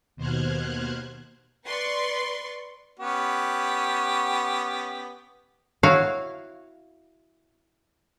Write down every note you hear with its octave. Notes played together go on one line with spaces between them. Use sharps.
D#2 B2 C5 F6 F#6 G#6
B4 D5 C6 C#6
B3 C#4 G4
E4 F#4 C#5 F5